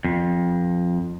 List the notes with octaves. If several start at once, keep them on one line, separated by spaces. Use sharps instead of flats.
F2